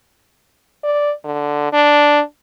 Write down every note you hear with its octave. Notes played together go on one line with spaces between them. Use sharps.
D5
D3
D4